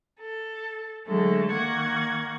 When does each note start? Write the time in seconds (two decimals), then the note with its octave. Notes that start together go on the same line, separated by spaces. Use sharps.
0.19 A4
1.07 D3 F#3 G#3 A3 A4
1.53 D#3 A#3 F#5 C#6 G#6